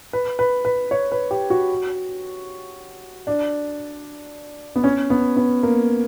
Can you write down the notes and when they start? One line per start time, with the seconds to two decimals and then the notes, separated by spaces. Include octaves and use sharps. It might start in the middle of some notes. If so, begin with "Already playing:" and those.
0.13 B4
0.39 B4
0.65 B4
0.91 C#5
1.12 B4
1.31 G4
1.50 F#4
3.27 D4
4.76 B3
4.84 C#4
5.10 B3
5.37 B3
5.63 A#3